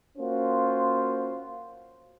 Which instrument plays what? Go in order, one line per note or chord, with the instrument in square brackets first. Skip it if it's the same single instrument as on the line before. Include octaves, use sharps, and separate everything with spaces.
[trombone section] A#3 C#4 F4 F#4 C5